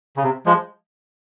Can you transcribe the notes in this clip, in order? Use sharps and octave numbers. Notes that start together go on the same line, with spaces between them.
C#3
C3
F3 G#3